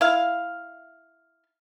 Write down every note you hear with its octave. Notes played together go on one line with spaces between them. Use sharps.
E4 F5